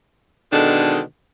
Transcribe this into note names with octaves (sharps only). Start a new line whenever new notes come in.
B2 D3 D#3 G#3 D4 A4